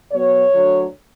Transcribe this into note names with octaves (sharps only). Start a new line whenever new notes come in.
B2 F#3 B3 C#5
D2 D3 F#3